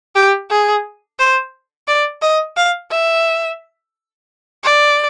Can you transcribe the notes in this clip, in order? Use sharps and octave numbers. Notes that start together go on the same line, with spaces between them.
G4
G#4
C5
D5
D#5
F5
E5
D5